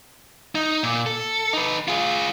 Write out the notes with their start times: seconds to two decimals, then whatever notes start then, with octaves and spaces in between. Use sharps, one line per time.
0.55 D#4
0.83 A#2
1.06 A4
1.53 D#4 B4
1.88 F4 G#4